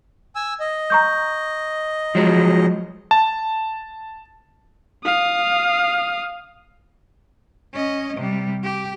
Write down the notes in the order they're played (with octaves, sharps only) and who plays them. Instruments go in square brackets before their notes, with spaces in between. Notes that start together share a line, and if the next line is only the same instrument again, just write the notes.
[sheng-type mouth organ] G#5 E6
D#5
[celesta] A#5 C#6 G6
[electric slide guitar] F3 F#3 G#3
[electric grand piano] A5
[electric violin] F5 D#6
[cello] C#4 D#5
C3 G3
G4